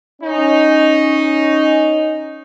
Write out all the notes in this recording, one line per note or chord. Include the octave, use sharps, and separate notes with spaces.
C#4 D#4